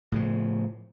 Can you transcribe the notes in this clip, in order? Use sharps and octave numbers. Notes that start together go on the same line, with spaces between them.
A2 C#3 F3